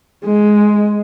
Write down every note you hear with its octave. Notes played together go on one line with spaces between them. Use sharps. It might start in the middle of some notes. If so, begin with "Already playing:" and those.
G#3